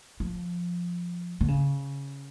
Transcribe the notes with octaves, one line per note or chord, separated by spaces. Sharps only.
F3
D3
C#3